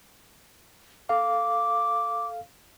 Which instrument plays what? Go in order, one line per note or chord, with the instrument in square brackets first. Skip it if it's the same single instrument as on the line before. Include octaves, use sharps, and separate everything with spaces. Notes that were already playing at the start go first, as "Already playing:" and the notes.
[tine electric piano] A4 F5 [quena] D6